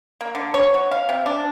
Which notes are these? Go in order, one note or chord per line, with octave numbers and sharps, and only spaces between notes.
A#3
D3
C#5
F#4
F5
C3
D4